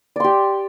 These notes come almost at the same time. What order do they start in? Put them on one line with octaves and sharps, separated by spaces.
D5 C6 G4